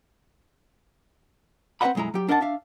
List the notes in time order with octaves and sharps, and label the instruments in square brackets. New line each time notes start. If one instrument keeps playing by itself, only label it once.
[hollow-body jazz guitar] C4 B4 C5 D#5 F#5 B5
B1 F#2 G#3 E4 A#5
F#3 G4
D4 A#4 D#5 F#5 G#5 A5
D4 E5 F5